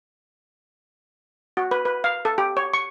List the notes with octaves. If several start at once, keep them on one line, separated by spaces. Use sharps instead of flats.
F#4
B4
B4
F5
A4
G4
C#5
C#6